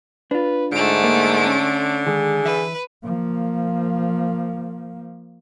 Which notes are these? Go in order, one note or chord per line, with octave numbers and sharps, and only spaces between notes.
D4 F4 B4
G#2 D3 A3 D7
A#3
C#4
D#3 G#3 G#4
E3 B4 E5
F3 A#3